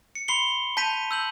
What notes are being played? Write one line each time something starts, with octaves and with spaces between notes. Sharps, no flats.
C#7
B5 C6 C7 C#7 G7
A5 G6 B6 D#7 F7
E6 G6 F#7